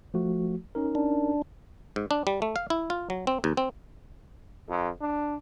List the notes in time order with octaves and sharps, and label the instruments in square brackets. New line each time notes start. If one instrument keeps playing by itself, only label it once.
[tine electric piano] F3 A3 F#4
C#4 D#4 A#4
[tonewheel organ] D4
[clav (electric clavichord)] G#2
D4
G3
A3
F5
E4
F4
F#3
C4
D#2
C4
[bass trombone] F2
D4